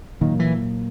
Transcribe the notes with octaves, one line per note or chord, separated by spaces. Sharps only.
A#2 D#3 F#3 A#3
E3